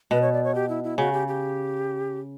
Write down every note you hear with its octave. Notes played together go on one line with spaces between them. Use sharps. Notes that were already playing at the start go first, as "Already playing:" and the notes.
B2 B4
C#5
D5
C#5
G4
E4
E4
C#3 F#4
G4
G4